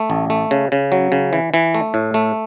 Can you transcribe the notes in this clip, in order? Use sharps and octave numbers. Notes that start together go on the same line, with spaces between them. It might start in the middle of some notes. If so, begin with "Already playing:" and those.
Already playing: A3
A1
A3
C#3
C#3
F#3
C#3
E3
E3
A3
A2
A3